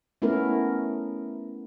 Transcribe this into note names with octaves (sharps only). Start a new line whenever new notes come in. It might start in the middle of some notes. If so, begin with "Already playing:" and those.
A3 B3 C#4 E4 A#4